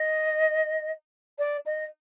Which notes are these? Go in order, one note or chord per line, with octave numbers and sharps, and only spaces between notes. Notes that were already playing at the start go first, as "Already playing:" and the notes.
Already playing: D#5
D5
D#5